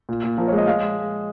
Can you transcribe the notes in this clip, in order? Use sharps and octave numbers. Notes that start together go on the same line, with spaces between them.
A#2
A#2
F3 A#4
C#5
G#3 D#5
G#3 F5